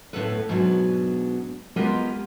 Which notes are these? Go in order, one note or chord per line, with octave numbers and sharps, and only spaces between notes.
A2 A3 B3 A4 B4
G#2 B2 F#3 B3 D4
G#3 B3 F4 G4 A#4 D#5